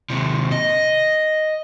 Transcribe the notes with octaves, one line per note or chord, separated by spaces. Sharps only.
D#2 C3
D#5